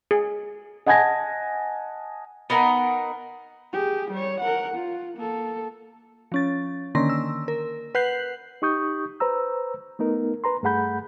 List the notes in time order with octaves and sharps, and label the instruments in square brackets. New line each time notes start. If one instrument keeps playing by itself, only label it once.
[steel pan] G#4
[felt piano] D#5 F#5 G#5 A5 G#6 A#6
[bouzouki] B3 D#4 A#4 F#5
[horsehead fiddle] G4 G#4
G3 C#5
A#4 F#5
F4
A#3 A4
[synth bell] F3 C#4 A6
D3 D#3 A#3 C#4 C6 A#6
E6
A#4
B4 F#5 F#6 G6 C7 F#7
[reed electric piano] D#4 G4 C#6 D#6 G6
B4 C5 A#5 E6
A3 B3 D#4 A#4
B4 A#5 C6
G2 A3 G#4 F#5 B5 G6